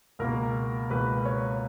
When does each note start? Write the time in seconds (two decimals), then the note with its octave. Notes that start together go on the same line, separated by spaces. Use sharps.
0.19 C#2 B2 A#3 A#4
0.90 C#2 B2 A#3 B4
1.25 C#5